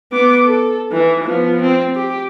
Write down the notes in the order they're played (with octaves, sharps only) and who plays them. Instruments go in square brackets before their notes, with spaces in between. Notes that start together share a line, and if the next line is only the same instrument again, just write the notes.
[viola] B3 D6
A4
E3
F3 B3
C4
G4